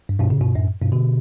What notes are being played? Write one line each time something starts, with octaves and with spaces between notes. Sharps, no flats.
G2
G2 B2
A2 C#3
G2 B2
F#2 A2
G2 B2
B2 D3